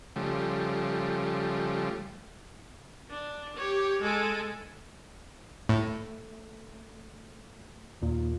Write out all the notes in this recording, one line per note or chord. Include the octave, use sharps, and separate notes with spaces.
C#3 F3 G3 A3
D4
G4 C#5
G#3 A4
A2 A3
D#2 A#2